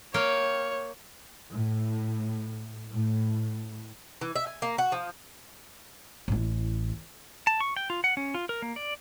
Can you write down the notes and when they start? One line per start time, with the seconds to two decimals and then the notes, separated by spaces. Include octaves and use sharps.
0.14 A#3 C#5 F5 G5
1.51 A2
2.91 A2
4.21 E3
4.35 E5
4.47 G#5
4.62 A#3
4.78 F#4
4.92 F3
6.28 A1 E4
7.47 A5
7.60 C#6
7.77 G5
7.90 F4
8.04 F#5
8.17 C#4
8.34 F4
8.49 A#4
8.62 A#3
8.76 D5